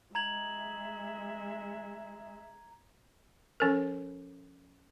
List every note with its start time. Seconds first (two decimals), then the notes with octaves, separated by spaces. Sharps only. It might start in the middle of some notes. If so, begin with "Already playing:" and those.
0.15 G#3 E5 A#5 G#6 F#7
3.60 F3 C#4 A4 A#4